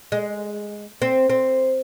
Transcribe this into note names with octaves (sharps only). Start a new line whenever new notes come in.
G#3
C4
C4